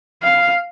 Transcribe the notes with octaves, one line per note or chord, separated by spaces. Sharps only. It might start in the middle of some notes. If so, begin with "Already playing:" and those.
F5